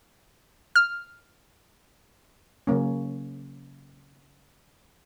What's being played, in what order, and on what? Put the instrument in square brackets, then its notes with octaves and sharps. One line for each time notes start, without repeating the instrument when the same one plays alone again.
[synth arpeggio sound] F6
[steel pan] C#3 F#3 A#3 C#4